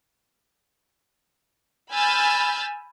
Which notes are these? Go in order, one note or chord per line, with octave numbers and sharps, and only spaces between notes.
G#5 B5 E6 F6 G6 A6